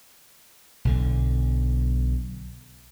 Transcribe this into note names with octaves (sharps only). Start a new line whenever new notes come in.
B1 D3